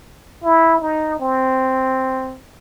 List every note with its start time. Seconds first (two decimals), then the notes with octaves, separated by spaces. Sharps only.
0.44 E4
0.81 D#4
1.19 C4